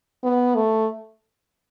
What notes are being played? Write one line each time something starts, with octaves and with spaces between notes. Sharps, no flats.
B3
A3